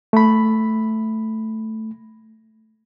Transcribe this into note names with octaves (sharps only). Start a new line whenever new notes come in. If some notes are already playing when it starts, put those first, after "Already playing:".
A3 B5